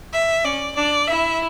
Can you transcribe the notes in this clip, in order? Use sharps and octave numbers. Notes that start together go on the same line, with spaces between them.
E5
C#4 D5
D4 D5
E4 E5